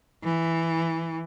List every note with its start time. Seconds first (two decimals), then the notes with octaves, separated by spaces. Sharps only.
0.24 E3